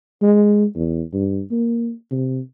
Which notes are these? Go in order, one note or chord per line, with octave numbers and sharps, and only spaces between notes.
G#3
E2
G2
A#3
C3